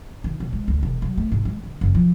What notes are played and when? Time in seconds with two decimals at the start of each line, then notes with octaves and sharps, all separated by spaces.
0.24 D#3
0.40 D#1
0.53 G#3
0.68 D2
0.83 E1
1.02 F#3
1.17 A3
1.32 G#2
1.45 G#3
1.63 D3
1.81 F#1
1.95 F3